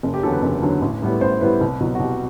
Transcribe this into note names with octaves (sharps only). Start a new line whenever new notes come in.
F#1
G4
E2 D3 F#3 A4
B4
F#1
E2 D3 F#3
A1
A2 G3 B3 E4
A1 C5
A2 G3 B3 E4 B4
C2
B2 F#3
F#4
C2 G4